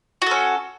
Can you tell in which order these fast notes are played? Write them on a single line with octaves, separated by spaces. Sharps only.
F#4 A4 C#4